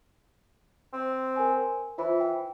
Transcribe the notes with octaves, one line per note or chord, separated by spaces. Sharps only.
C4
A#4 G#5
E3 F4 C5 B5
G5